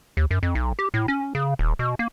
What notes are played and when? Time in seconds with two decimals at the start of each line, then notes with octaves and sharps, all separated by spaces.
0.17 D#2
0.31 F#2
0.43 F2
0.55 B1
0.79 G4
0.94 A2
1.08 C#4
1.35 C#3
1.59 D#1
1.79 B2
1.99 A#3